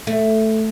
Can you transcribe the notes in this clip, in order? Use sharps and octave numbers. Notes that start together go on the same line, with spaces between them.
A3